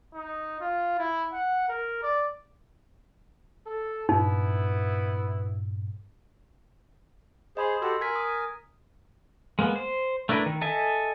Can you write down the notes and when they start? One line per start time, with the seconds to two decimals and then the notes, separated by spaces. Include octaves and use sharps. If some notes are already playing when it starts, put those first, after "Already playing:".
0.14 D#4
0.61 F4
0.99 E4
1.33 F#5
1.69 A#4
2.03 D5
3.67 A4
4.09 G2 A#2 B3 D#4 E4
7.57 G#4 C5 D#5 B5 C6
7.82 F#4 G4 A4 C6 E6
8.01 A#4 G#5 G#6 B6
8.16 D#6
9.59 G#3 A#3 B3
9.76 C5
10.29 A3 D4 E4 A#4 B4
10.46 D#3
10.61 A4 D#5 E5 G#5